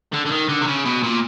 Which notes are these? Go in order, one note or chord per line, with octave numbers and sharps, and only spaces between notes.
D3
D3
D#3
D3
C3
C#3
B2
A#2